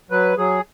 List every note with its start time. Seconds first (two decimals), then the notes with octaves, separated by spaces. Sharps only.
0.10 F#3 B4
0.38 F#3 G#4